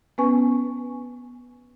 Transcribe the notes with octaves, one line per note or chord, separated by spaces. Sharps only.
B3 C#4 B4 G#5 C#6